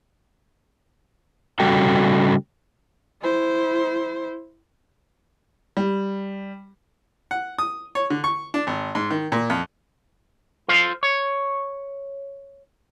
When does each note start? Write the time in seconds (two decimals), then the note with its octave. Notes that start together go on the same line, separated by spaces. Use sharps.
1.60 C#3 G3 F#4 A4 G5
3.22 E4 C5
5.77 G3
7.31 F#5
7.58 D#6
7.95 C#5
8.10 D3
8.24 C#6
8.54 D4
8.67 G#1
8.95 G#2
9.11 D#3
9.32 A#2
9.50 F2
10.68 F4 A4 C5 F5
11.03 C#5